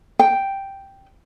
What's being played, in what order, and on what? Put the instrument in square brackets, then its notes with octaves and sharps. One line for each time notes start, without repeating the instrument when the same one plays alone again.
[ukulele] G5